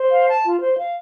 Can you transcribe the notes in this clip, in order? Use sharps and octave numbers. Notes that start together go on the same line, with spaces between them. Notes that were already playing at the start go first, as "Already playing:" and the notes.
Already playing: C5
F5
A5
F4
C5
F5